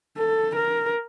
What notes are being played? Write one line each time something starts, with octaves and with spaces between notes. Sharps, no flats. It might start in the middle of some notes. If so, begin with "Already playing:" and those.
A4
A#4